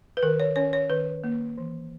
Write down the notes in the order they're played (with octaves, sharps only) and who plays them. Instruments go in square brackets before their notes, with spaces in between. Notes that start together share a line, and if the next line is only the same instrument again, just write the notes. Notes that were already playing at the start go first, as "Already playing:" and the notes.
[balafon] B4
D#3 A#4
C#5
C#4 C#5
C#5
D#3 B4
A#3
E3